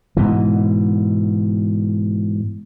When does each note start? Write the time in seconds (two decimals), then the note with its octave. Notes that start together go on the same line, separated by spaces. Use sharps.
0.17 G#2 B2 E3